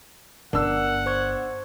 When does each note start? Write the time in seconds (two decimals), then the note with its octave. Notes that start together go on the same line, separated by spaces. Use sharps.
0.53 G1 D4 A#4 F#5 E6
1.06 C5 C#6 G#6